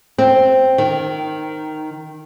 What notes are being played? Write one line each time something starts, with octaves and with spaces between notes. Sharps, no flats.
C4
D#3